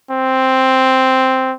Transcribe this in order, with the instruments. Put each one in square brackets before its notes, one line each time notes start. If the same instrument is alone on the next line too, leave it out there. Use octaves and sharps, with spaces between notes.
[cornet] C4